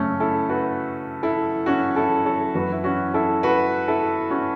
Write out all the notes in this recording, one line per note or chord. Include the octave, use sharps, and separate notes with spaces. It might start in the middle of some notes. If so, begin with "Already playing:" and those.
Already playing: F#2 C#3 A3 C#4
E4 A4
F#4 B4
E4 A4
C#4 F#4
E4 A4
A4 C#5
F#2 E3 F#4 B4
E4
C#4 F#4
E4 A4
F#4 B4
E4 A4
C#4 F#4